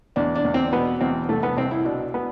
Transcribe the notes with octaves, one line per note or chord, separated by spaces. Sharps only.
E2 D4
D4
E2
C4
B2 B3
E2 C4
C2 A3
B3
C2 C4
E4
B2 D4
B3